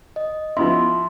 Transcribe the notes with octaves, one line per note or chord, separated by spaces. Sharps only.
D#5
F3 B3 E4 E5 C6